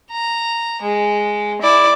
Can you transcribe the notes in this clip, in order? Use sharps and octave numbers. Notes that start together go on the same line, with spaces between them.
A#5
G#3
E4 D5